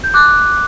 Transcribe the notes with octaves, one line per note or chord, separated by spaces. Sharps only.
G6
D6 F#6